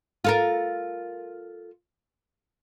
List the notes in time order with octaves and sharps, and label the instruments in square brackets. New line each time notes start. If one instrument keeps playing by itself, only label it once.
[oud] F4 A4 A#4